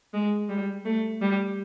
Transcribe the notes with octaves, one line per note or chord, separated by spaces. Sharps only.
G#3
G3
A3
G3